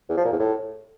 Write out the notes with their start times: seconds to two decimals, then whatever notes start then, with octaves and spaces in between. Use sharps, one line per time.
0.10 E2
0.17 F3
0.25 A#2
0.32 E2
0.39 A2